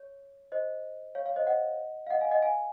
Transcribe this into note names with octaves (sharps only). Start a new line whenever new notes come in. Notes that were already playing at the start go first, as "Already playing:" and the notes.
Already playing: C#5
C5 D#5
C#5 F5
C#5 F5
C5 D#5
D#5 F#5
F5
D#5 F#5
F5 G#5
D#5 F#5
F5 G#5